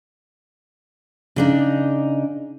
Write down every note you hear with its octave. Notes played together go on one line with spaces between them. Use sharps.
C#3 D4 D#4